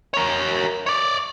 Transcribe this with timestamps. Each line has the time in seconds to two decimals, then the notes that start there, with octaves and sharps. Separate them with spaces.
0.14 A#4 C#5
0.86 C#5 D5